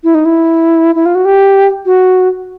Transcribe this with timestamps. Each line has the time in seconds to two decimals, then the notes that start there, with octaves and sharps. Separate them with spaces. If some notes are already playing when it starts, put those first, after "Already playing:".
0.04 E4
0.15 D#4
0.25 E4
0.95 E4
1.06 F4
1.15 F#4
1.25 G4
1.86 F#4